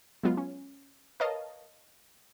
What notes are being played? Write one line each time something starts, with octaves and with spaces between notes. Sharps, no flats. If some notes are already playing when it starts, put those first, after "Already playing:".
F#3 G#3 B3 F4
C#4
A#4 B4 C#5 D#5 F5 A5